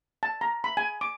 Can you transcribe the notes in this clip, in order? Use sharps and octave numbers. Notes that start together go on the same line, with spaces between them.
A5
A#5
B5
G#5
D6